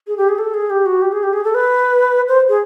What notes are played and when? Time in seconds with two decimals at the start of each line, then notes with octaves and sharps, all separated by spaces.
0.07 G#4
0.17 G4
0.29 G#4
0.38 A4
0.54 G#4
0.70 G4
0.86 F#4
1.02 G4
1.12 G#4
1.23 G4
1.33 G#4
1.44 A4
1.55 B4
2.28 C5
2.49 G#4